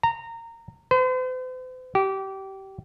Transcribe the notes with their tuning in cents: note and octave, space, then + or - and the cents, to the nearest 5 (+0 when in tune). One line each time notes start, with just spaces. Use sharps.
A#5 -20
C5 -45
G4 -25